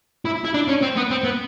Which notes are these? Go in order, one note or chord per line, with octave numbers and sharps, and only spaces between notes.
E4
E4
D4
C#4
C4
B3
C4
B3